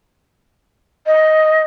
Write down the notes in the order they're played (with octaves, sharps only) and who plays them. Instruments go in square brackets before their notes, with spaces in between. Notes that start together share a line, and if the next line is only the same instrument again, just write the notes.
[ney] D#5